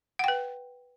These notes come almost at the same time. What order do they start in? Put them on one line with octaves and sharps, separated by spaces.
F#5 G5 B4